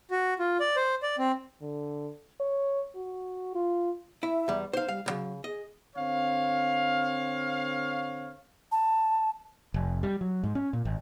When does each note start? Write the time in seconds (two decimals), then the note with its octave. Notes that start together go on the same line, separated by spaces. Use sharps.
0.11 F#4
0.39 F4
0.60 D5
0.76 C5
1.03 D5
1.18 C4
1.62 D3
2.40 C#5
2.96 F#4
3.55 F4
4.23 E4 E5
4.48 E2 G3
4.73 D#4 C5 F5
4.88 G3 F5
5.06 B1 C#3 F#3
5.44 G#4 D#5
5.96 D3 C4 C#5 F5
8.72 A5
9.74 F1
10.03 G3
10.21 F#3
10.44 G#2
10.55 C#4
10.73 A#2
10.85 G#1